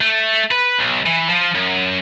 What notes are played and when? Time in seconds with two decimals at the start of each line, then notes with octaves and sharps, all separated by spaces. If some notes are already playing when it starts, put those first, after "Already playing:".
0.01 A3
0.51 B4
0.78 B1
1.06 E3
1.29 F3
1.55 F#2